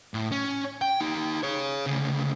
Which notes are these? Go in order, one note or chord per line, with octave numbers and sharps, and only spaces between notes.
A2
C#4
G5
D#4 G4
G#4 C#5
D2 C#3